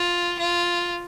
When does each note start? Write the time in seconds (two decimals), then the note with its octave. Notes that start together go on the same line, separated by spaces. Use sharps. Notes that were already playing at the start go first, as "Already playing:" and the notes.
Already playing: F4
0.39 F4